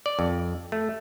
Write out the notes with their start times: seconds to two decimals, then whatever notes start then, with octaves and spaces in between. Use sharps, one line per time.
0.06 D5
0.19 F2
0.72 A3